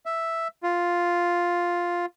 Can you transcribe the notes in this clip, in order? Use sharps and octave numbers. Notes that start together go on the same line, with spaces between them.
E5
F4